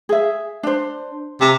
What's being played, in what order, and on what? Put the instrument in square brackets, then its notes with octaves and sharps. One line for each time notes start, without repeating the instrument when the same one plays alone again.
[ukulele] G#4 E5
D4 C5
[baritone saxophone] C3 [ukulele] A#5